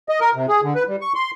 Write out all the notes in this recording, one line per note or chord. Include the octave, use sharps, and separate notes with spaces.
D#5
A#4
C3
G#4
D3
B4
G3
C#6
C6